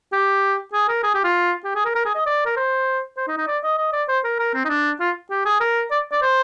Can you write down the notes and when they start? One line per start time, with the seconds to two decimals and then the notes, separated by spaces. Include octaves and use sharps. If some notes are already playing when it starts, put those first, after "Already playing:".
0.13 G4
0.73 G#4
0.89 A#4
1.04 G#4
1.14 G4
1.24 F4
1.64 G4
1.75 G#4
1.85 A#4
1.95 A#4
2.05 G#4
2.15 D#5
2.26 D5
2.46 A#4
2.57 C5
3.17 C5
3.27 D#4
3.38 D#4
3.47 D5
3.63 D#5
3.78 D#5
3.93 D5
4.08 C5
4.24 A#4
4.39 A#4
4.54 C4
4.65 D#4
4.69 D4
5.00 F4
5.30 G4
5.46 G#4
5.61 A#4
5.91 D5
6.12 D5
6.22 C5